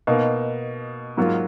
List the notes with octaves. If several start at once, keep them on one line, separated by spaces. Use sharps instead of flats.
B2 A#3 D#4
G#2 F#3 A#3 F4